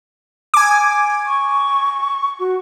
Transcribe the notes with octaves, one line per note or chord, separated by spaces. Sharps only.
G#5 D6
C#6
F#4